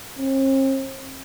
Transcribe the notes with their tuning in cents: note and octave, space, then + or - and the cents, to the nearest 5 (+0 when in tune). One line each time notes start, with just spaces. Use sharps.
C4 +45